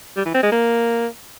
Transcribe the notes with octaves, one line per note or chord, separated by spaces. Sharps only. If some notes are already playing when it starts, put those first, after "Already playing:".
G3
E3
C4
G#3
A#3